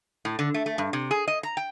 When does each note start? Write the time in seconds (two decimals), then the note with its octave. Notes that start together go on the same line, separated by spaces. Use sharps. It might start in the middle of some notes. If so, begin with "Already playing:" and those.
0.25 A2
0.39 D3
0.54 A3
0.66 A3
0.78 G2
0.93 C3
1.11 G#4
1.28 D#5
1.43 A#5
1.57 G5